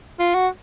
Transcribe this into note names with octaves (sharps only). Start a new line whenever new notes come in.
F4
F#4